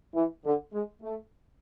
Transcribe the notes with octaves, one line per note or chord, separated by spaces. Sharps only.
E3
D3
G#3
A3